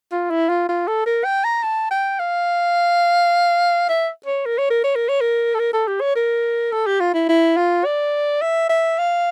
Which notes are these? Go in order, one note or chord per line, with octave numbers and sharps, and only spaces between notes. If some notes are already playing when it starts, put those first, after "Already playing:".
F4
E4
F4
F4
A4
A#4
G5
A#5
A5
G5
F5
E5
C#5
A#4
C#5
A#4
C#5
A#4
C#5
A#4
A4
A#4
A4
G4
C#5
A#4
A4
G4
F4
E4
E4
F4
D5
E5
E5
F5